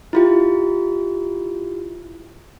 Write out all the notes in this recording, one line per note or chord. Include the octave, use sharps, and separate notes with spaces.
E4 F4 G4